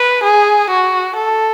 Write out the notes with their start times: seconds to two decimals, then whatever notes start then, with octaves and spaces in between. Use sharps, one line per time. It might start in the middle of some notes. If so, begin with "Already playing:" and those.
Already playing: B4
0.24 G#4
0.70 F#4
1.17 A4